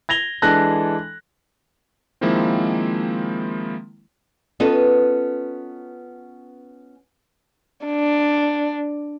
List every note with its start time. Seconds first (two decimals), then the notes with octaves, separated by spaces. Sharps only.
0.09 G#6 A#6 F7 G7
0.42 E3 G#3 D4 A4 F#6 A#6
2.21 D#3 F3 G#3 A#3 C4 E4
4.60 B3 C#4 F4 A4 B4 D#5
7.86 D4